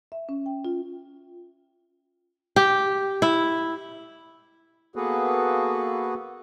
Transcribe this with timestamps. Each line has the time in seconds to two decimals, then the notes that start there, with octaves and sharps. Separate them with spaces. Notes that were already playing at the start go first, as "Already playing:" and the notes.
0.12 E5
0.29 C#4
0.46 G5
0.65 F4
2.56 G4
3.22 E4
4.96 A#3 B3 F#4 G#4 A4 B4